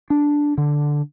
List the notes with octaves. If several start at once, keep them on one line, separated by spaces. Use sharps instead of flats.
D4
D3